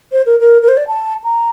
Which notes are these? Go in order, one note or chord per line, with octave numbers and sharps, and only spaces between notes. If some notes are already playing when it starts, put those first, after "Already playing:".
C5
A#4
A#4
A#4
C5
D5
A5
A#5